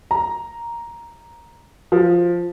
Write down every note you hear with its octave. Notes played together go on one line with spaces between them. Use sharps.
A#5
F3